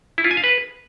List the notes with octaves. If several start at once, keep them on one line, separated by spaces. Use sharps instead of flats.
E4
F4
G#5
F5
B4